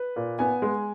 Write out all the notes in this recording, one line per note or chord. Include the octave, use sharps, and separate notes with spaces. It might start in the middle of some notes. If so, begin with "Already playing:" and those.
Already playing: B4
A#2
B3 G#5
G#3